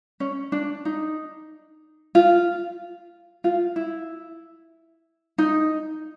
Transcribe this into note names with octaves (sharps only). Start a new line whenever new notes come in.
C#4
D4
D#4
F4
F4
E4
D#4